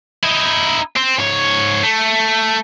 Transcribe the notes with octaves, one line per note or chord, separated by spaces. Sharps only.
D#4 E4
C4
G#2 C#5
A3